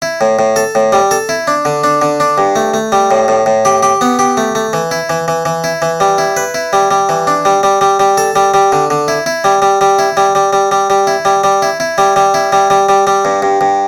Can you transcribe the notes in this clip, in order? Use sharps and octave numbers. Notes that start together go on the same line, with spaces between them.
E4
A2
A2
A4
A2
G3
A4
E4
D4
D3
D4
D3
D4
G2
A3
A3
G3
A2
A2
A2
G4
G4
B3
G4
A3
A3
E3
E4
E3
E3
E3
E4
E3
G3
E4
B4
E4
G3
G3
E3
D4
G3
G3
G3
G3
A4
G3
G3
D3
D3
E4
E4
G3
G3
G3
E4
G3
G3
G3
G3
G3
E4
G3
G3
E4
E4
G3
G3
E4
G3
G3
G3
G3
G2
G2
G2